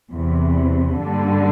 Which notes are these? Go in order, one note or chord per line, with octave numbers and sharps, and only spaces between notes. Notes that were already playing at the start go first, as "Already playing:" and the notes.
E2 C3 E3
G2 D3 G3 A#3